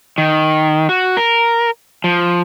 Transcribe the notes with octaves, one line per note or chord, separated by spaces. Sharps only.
D#3
F#4
A#4
F3